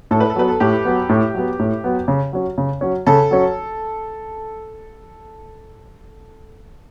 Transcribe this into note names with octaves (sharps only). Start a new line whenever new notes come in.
A2 A4
B4
A4
F#3 B3 B4
A4
A2 G4
F#3 B3
A2
F#3 B3
A2
F#3 B3
C#3
F#3 C#4
C#3
F#3 C#4
C#3 A4
F#3 C#4